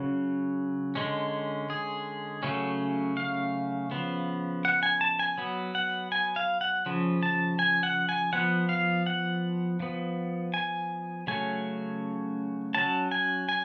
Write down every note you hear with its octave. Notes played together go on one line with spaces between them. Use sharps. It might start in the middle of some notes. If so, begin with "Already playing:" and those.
Already playing: C#3 F#3 C#4
D3 G#3 C#4
G#4
C#3 F#3 A3 C#4
F5
C#3 F3 B3
F#5
G#5
A5
G#5
F#3 B3
F#5
G#5
F5
F#5
C#3 F3
A5
G#5
F#5
G#5
F3 B3 F#5
F5
F#5
F3 B3
G#5
C#3 F#3 A3 C#4 G#5
F#3 C#4 A5
G#5
G#5